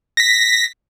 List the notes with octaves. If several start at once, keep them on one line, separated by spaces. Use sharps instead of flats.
A#6 B6